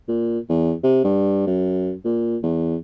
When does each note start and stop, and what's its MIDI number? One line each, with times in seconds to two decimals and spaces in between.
0.08 0.39 46
0.49 0.73 40
0.83 1.01 48
1.04 1.46 43
1.47 1.93 42
2.04 2.37 46
2.43 2.77 40